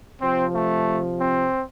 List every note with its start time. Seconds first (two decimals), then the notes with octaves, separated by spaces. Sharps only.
0.22 C3 F3 C4
0.54 A3
1.18 C4